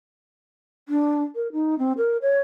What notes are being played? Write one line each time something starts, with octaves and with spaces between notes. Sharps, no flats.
D4
A#4
D#4
C4
A#4
C#5